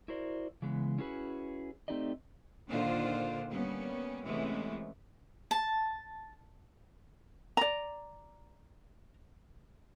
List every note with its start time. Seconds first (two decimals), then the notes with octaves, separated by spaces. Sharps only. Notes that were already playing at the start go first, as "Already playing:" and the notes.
0.08 E4 F#4 A#4 C5 D5
0.62 C#3 E3 G#3 B3
0.98 C#4 E4 F#4 G#4 B4
1.88 A3 C4 D#4 G4 D5 D#5
2.69 A#2 D3 D#3 D4 F4 C5
3.49 G3 A#3 B3 C#4
4.25 C3 E3 G#3 A3 B3 C#4
5.51 A5
7.57 D5 A#5